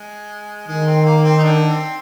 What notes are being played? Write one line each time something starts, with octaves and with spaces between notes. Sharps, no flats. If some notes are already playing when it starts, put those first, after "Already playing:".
Already playing: G#3
D#3 G#3
C4
A#3
C4
D#4
D3 D4
C4